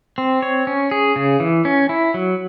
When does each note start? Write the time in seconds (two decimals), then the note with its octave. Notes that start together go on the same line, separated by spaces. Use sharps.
0.18 C4
0.42 C#5
0.67 C#4
0.91 G#4
1.16 C#3
1.40 E3
1.65 C#4
1.89 E4
2.14 F#3